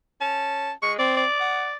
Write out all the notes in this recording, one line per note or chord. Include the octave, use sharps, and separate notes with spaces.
C#4 A5
G#3 C#6
C4 D5
D5
F#5